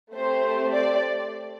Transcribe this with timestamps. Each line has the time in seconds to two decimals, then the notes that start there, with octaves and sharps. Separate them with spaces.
0.13 A3 C4 G4 C5
0.73 D5